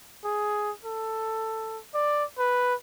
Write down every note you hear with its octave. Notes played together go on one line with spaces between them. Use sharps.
G#4
A4
D5
B4